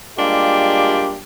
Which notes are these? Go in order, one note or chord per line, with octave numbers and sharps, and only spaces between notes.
G3 G#3 A#3 D4 F4 G4